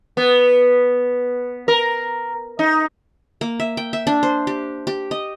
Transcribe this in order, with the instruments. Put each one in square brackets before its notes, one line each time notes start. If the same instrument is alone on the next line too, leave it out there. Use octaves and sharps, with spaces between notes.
[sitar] B3
A#4
D#4
[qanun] A#3
E5
G5
E5
D4
C5
G4
G4
D#5